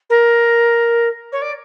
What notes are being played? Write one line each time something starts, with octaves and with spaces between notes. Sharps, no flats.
A#4
C#5
D5